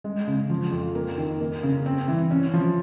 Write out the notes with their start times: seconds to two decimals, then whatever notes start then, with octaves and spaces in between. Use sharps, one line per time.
0.04 G#3
0.27 C#3
0.50 F3
0.72 F2
0.95 A#3
1.18 D#3
1.40 A#3
1.63 C#3
1.86 C4
2.08 E3
2.31 C#4
2.54 F3